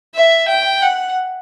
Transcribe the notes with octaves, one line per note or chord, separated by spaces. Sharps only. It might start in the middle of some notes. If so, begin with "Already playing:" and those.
E5
G5
F#5